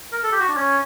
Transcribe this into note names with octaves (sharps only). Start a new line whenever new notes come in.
A#4
A4
G4
F#4
D4
C#4